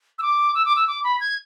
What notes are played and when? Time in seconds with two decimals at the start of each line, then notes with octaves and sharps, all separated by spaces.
0.19 E6
0.22 D6
0.55 E6
0.65 D6
0.76 E6
0.88 D6
1.04 B5
1.20 G#6